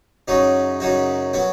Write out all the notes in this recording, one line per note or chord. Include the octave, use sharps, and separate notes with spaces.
F#2 C#3 F#3 D#4 F#4
F#2 C#3 F#3 D#4 F#4
F#3 B3 F#4